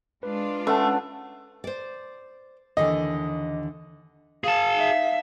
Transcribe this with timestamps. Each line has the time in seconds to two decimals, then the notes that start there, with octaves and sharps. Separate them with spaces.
0.23 G#3 D4 F4 B4
0.67 A3 C#4 A4 B4 F#5
1.64 C5 D5
2.77 D#2 D3 E3 D#5
4.44 G#4 F5 A5
4.75 D#4 E5